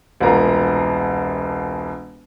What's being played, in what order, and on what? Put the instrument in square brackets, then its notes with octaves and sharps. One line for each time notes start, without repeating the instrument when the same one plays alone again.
[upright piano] E1 C2 A#3 F4 A#5